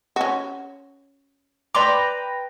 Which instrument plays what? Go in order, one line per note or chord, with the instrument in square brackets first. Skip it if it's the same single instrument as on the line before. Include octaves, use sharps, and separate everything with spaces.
[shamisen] C#4 F#4
[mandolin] B4 G5 A#5 [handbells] D5 C6 D6